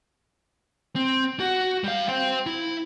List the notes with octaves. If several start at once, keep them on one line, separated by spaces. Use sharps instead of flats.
C4
F#4
G3 F5
C5 G5
E4